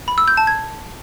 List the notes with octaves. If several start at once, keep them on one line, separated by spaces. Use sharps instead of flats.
B5
E6
G6
A5
G#6